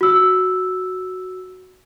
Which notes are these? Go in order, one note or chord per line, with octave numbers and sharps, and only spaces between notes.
F#4 E6